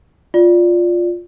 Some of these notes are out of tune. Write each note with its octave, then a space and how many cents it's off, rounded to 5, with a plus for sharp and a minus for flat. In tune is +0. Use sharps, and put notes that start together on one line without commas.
F4 +5 D5 +0